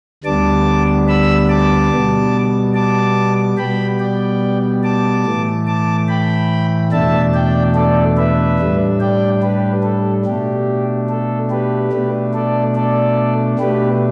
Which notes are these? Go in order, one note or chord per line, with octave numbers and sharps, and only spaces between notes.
D2 D3 G3 B3 D4 A5 D6
B5 E6
A5 D6
B2 G3 B3
A5 D6
B2 G3 B3 G5 B5
D5 G5
A5 D6
A2 E3 A3
A5 D6
G5 B5
E2 B2 A3 D4 E5 A5
D5 G5
A4 D5
B4 E5
A2 G3 D4
D5 G5
G4 B4
A4
B2 A3 D4 G4
A4
G4 B4
B2 A3 D4
A4 D5
A4 D5
B2 A3 D4 G4 B4